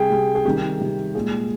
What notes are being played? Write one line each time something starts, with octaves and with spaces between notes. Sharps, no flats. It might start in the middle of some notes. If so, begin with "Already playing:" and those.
Already playing: C3 G3 G#4 G5
C3 G3
G#4
C3 D#3 G3 G4
C3 D#3 G3
A#2 G#3 G#4